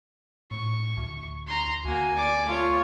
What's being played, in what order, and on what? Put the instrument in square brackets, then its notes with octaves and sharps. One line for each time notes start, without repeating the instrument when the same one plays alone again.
[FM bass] A2 [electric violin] C#6
[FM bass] D2
[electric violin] A#5 C6
[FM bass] D2 [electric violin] A#3 F#4 [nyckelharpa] G#5
[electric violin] D5 D6
[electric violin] A3 [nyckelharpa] F4 C#5